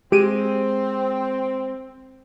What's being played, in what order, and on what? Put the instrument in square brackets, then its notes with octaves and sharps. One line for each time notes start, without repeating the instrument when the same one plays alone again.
[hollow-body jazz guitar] G#3 [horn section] C4 [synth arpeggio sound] G4 D7 D#7